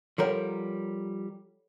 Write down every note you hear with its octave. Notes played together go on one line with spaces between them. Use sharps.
F3 G3 A4 A#4 C#5 F#5